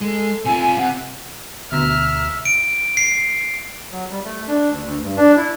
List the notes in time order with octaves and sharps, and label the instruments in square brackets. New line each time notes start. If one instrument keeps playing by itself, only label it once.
[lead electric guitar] G#3 [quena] A4
[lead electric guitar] C3 F4 [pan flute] G#5
[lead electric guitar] C3 [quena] F#5
[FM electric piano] D2 B2 A#5 [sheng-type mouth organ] E5 [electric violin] F6
[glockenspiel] D7
C7
[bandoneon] F#3
G3
A3
D4
D2
D2
G2
D4
E4